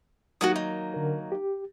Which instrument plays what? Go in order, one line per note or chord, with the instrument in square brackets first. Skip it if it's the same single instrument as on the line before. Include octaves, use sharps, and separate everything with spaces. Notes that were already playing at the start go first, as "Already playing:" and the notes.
[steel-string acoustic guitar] D#3 F#3 A#3 [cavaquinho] F#4 F#5 D#6
[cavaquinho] D#4
[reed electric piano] D3 A#4
G4